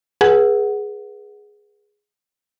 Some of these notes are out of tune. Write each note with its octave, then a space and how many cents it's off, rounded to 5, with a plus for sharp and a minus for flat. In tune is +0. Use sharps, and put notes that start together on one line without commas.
G#4 +0 B4 -30 F#5 +0